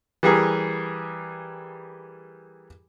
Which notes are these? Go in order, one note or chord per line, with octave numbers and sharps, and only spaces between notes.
E3 G3 G4 G#4 A#4